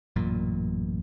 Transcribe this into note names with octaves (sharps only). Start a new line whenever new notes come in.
A1 F#2 A#2